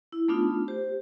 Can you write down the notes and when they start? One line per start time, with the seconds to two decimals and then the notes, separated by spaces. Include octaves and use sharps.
0.12 E4
0.28 A3 B3 D4 D#4 F4
0.68 G4 C5